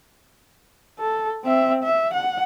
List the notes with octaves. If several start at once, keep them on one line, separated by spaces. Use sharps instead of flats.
A4
C4 E5
E5
F#5